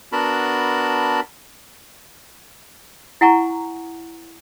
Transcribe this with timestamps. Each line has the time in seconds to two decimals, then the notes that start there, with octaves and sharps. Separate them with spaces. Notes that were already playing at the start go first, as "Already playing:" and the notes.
0.12 B3 D4 F#4 A#4 A5 B5
3.21 E4 F#5 G#5 A#5 C#6